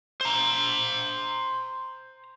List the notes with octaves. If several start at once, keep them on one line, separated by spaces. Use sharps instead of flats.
C5 A#5